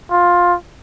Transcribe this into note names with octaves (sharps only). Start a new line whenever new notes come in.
F4